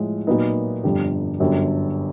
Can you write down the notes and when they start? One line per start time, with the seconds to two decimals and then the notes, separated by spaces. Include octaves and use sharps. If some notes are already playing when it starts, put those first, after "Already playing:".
Already playing: A2 F3 G#3
0.27 A#2 F#3 B3 D#4
0.83 G1 F2 D3 G3
1.40 G1 F#2 D3 G3